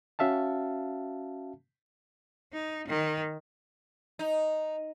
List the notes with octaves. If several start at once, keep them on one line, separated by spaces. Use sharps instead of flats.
C#4 F#4 E5 F5 A5
D#4
D#3
D#4